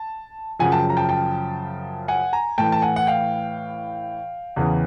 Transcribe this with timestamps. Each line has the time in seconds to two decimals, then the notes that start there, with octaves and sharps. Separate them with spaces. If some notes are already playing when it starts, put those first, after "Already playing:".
Already playing: A5
0.59 F#2 C#3 F3 F#5 G#5
0.72 G5 A5
0.90 A#5
0.97 G5 A5
1.09 G5 A5
2.08 F#5 G#5
2.33 G#5 A#5
2.58 A2 E3 G5 A5
2.72 A5
2.82 F#5 G#5
2.96 F#5
3.07 F5 G5
4.56 E2 C#3 E3